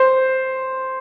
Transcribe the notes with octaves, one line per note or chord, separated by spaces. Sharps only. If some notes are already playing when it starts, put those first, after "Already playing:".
Already playing: C5